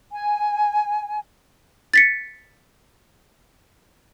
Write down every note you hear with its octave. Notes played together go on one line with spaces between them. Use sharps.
G#5
A6 B6 C#7